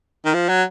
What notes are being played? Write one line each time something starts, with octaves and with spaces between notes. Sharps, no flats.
D#3
F3
F#3